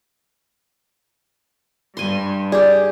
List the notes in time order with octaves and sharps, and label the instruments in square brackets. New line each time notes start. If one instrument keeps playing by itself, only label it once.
[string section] G2 [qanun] G#5 C6
[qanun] G4 G#4 [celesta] D5